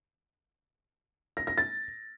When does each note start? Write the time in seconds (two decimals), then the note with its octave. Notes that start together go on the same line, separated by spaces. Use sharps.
1.37 A#6
1.47 A#6
1.58 A6